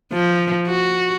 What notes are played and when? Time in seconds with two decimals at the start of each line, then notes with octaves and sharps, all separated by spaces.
0.12 F3
0.67 F#4